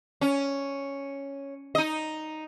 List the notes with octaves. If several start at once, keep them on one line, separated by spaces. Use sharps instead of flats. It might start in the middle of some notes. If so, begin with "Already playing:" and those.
C#4
D#4 D#5